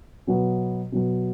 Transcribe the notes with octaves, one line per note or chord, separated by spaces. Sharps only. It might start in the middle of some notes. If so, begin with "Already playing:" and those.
B2 F#3 B3
B2 F#3 B3